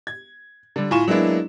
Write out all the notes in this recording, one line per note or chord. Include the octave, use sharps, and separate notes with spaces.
G#6
D3 G3
A2 F4 G#5 C#6 E7
F#3 G#3 A#3 B3 D4 E4